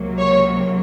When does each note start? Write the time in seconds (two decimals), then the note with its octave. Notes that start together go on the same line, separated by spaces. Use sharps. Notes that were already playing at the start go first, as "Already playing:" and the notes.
Already playing: C#2 C3 F#3 A#3
0.18 C#5